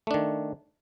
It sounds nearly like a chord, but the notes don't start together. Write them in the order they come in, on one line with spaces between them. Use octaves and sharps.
A3 D4 D#3